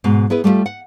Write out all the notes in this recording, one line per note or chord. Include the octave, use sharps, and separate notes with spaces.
G#2 B2
B3 E4 G#4 B4
G3 A3 B3 F4 G4
F#5